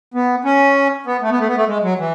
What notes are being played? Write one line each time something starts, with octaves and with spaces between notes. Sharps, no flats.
B3
C#4
B3
A3
B3
A3
B3
A3
G#3
F#3
E3